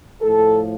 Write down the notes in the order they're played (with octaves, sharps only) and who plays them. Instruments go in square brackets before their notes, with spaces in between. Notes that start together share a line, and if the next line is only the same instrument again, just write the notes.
[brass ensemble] A2 F3 A4